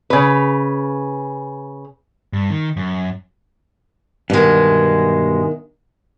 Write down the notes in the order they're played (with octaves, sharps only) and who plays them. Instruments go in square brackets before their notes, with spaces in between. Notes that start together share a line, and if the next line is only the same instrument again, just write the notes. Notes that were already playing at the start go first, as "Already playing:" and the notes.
[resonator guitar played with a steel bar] C#3 B4
[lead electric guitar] G2
D#3
F#2
[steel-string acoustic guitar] E2 D#3 [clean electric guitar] G2 B2 G#3